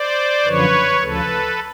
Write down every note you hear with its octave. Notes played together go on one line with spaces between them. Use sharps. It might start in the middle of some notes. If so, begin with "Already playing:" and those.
Already playing: C5 D5
F#2 D3 F3 B4 C#5
D2 C#3 F3 A4 B4